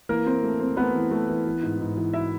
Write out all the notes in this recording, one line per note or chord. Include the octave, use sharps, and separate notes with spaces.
E3 A#3 A#4
C4
A3
C4
A3 B3 B4
E3
A3
E3
E3
G#2
G#2
E3
E4 E5